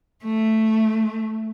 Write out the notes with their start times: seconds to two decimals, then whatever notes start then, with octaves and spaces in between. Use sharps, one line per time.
0.24 A3